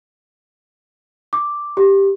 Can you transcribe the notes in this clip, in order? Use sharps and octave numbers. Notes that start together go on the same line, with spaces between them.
D6
G4